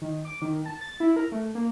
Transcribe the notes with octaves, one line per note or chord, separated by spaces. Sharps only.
D#3
D6
D#3
A5
A6
E4
A#4
A3
A#3